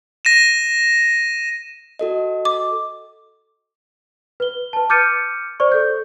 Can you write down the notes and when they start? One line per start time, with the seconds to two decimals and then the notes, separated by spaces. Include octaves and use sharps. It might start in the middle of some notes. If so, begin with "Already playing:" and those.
0.25 A#6 D#7 E7
1.99 F#4 A4 D#5
2.45 D6
4.40 B4 G7
4.73 B4 A5
4.90 D6 F6 G6 A6 C#7 D#7
5.60 C5 D5 C#6
5.72 A4 G6